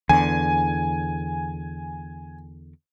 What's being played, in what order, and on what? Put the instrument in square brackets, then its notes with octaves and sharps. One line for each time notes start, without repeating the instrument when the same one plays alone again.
[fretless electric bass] E2 D3 [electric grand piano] G#5